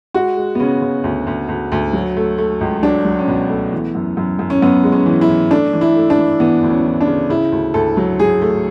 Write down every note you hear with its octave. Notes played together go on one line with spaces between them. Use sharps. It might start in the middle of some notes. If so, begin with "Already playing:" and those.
G#3 F#4
G#3
B3
C#3 C#4
C#3
D2
D2
D2
D2
F#3
A3
A3
C#2
F#3 D4
F#3
C#4
B2 B3
A3
E3
F#2
F#2
F#2
C#4
F#2 B3
G#3
C#4
E3
E4
E3
A3 D4
E3
E4
A3
D4
E3
E3 B3
D2
C#4
E3
D4
C#3
C#3 E4
D2
D2 A4
F#3
F#3 G#4
A3